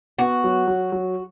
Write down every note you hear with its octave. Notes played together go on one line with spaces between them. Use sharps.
B3 F#4
F#3
F#3
F#3